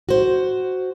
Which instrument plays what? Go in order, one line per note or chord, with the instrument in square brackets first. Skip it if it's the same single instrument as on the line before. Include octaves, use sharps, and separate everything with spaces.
[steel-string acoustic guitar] F#4 C5